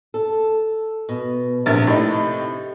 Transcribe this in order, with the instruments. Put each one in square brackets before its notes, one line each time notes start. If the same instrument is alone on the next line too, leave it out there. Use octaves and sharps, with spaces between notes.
[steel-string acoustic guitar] A4
B2
[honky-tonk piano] A#1 A6 [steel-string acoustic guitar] G#2 C3 A#4
[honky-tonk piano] A2 D#4 [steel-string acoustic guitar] C3